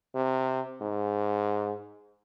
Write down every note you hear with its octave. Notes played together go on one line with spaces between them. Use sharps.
C3
G#2